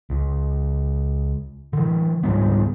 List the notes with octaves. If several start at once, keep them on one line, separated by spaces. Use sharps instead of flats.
C#2
D3 E3
C#2 G#2 G3 B3